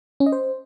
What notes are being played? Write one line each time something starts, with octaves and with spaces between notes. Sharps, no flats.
C#4
D#5
C5